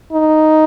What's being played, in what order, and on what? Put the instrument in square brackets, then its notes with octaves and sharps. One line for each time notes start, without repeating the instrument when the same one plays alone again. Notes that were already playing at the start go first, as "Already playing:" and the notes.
[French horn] D#4